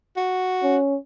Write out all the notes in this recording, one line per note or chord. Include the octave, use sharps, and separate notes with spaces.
F#4
C#4